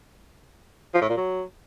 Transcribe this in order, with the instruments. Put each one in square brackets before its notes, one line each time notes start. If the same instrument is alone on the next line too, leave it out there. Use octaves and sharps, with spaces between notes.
[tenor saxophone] F3
A2
A#2
F#3